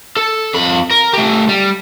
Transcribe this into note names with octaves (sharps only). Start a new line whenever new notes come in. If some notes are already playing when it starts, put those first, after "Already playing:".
A4
F2 B5
A#4
A3 G4
G3